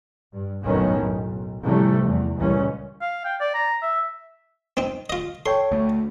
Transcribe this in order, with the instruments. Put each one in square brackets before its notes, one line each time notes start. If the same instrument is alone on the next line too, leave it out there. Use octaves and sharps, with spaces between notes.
[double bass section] G2
F#1 B1 A2 D#3 B3 C#4
B1
A2 C3 E3 F3 G3 A3
E2
C#2 A#2 E3 G3 C#4
[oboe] F5
G5
D5
A#5
E5
[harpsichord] C4 D#4
F4 D#5
[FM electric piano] A4 C#5 G5 [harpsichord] C6
[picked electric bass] D2 A3